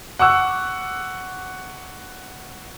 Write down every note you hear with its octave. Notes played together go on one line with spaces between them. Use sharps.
F#5 C#6 D6 E6 F#6